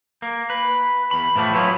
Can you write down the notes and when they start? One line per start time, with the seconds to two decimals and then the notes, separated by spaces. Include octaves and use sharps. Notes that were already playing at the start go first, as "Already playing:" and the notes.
0.22 A#3
0.50 B4
1.11 E2 B5
1.36 A2 E3 F3 A3
1.53 F#3 B3 C#4 E4 F4